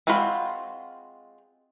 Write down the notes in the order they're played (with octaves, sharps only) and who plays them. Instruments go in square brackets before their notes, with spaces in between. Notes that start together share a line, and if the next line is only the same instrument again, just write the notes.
[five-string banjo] G#3 C4 F4 F#4 B5